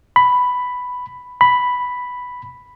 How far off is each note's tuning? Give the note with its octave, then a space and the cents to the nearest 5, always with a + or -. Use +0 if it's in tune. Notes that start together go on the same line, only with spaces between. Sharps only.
B5 +5
B5 +0